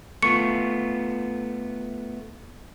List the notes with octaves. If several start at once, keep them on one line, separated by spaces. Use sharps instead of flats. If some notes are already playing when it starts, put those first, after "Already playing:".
A3 B3 F4 C#6 C#7